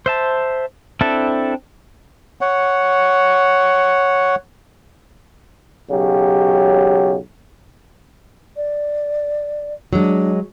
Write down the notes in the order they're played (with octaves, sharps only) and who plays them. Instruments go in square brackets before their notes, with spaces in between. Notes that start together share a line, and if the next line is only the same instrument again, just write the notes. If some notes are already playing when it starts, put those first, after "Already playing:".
[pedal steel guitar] C5 E5 A5
C4 D4 E4 A4 E5
[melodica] C#5 F#5
[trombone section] B1 C#3 F#3 G4
[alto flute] D5
[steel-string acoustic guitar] F#3 G#3 [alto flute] D4